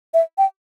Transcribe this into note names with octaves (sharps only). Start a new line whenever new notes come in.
E5
G5